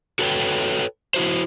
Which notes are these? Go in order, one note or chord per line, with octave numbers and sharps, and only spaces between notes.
F#4 A4 B4 C#5 G5
E4 F#4 C5